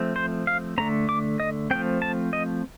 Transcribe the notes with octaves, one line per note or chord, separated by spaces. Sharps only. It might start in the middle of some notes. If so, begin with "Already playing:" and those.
Already playing: F3 A3 C4
C5
F5
D3 A3 C4 A#5
D6
D#5
F3 A3 C4 G5
A5
D#5